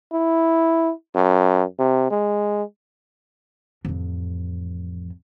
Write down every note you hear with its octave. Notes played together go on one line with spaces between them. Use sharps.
E4
F#2
C3
G#3
A1 F2